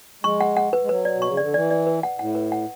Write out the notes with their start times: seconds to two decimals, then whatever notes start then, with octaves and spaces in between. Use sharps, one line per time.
0.23 G#3 C#6
0.41 F#5
0.57 F#5
0.73 B4
0.83 G#3
0.89 F#3 B4
1.05 D5
1.14 B2
1.22 C#6
1.28 C#3
1.37 D3 D5
1.54 E3 D5
1.71 D5
1.87 B4
2.03 F#5
2.19 A2 F#5
2.35 B4
2.52 F#5